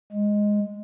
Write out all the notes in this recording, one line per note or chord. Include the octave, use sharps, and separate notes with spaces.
G#3